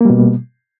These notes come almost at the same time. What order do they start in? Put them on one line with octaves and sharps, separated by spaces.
A#3 G3 B2